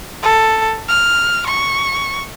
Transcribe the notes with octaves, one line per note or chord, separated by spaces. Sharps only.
A4
F6
C#6